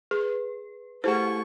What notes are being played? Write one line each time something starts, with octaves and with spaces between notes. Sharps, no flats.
G#4 B4
A3 E4 G4 G#4 C5 F#5 C#6